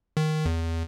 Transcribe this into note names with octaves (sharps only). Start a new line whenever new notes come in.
D#3
E2